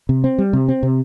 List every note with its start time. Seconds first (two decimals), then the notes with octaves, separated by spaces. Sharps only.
0.09 C3
0.24 C4
0.38 G3
0.53 C3
0.68 C4
0.83 C3